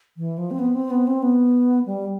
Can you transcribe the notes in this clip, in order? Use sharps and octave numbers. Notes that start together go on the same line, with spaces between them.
E3
F3
C4
B3
C4
B3
C4
B3
G3